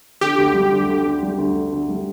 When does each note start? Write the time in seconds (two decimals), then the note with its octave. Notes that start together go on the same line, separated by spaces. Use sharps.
0.21 D3 G4
0.38 D2
0.54 G3
0.71 D2
0.88 D3
1.06 D2
1.23 G3
1.38 D2
1.55 D3
1.72 D2
1.89 G3